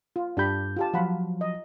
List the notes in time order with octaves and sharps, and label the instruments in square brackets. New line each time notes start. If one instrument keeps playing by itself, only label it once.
[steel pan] F4
[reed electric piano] G2 G6 [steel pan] D4 G4 B5
[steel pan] F4 G4 A5
[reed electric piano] F3 F#3 [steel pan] F4 F#5 B5
[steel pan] D#5